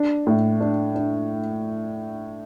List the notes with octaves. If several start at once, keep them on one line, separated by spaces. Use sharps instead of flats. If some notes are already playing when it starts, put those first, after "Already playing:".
Already playing: D4
A2
D4
D4